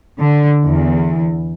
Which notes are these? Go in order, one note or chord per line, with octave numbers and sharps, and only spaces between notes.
D3
E2